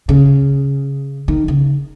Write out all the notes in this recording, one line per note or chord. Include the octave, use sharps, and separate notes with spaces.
C#3
D#3
C#3